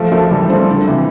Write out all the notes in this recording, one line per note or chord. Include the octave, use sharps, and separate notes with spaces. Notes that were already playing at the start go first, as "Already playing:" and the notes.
Already playing: F3 A3
F3 A3
E3 G3
A3 C4
D3
C3 E3